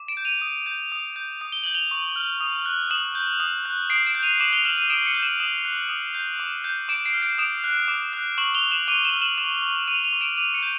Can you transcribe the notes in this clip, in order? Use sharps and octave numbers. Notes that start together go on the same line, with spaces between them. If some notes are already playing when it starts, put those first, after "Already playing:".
Already playing: D6
D7 E7
G6
D#7 F7
D#6
G6
D#6
G6
D#6
G7
G6 F#7
F7 G7
C#6
F6
D#6
F#6
D#6 E7 F#7
G6
D#6
F#6
D#6 C7 D7
D7 E7
G6
D#7 F7
D6 E7 F#7
F7 G7
F6 E7 F#7
D#7 F7
D#6 D7 E7
C#7 D#7
G6
E7 F#7
D#6 E7 F#7
F#6
D#6
G6
D6
G6
D6 D7 E7
C7 D7
F6
C7 D7
D#6 D7 E7
F#6
D6
F#6
C#6 E7 F#7
F7 G7
C#6
E7 F#7
D6 D#7 F7
E7 F#7
F6
E7 F#7
C#6 E7 F#7
C#6
C#6 D#7 F7
D#7 F7
C#6
D7 E7
D6 D#7 F7
C#7 D#7
G6